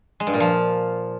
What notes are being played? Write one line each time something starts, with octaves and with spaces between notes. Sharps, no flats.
G#3
G2
A#2
F3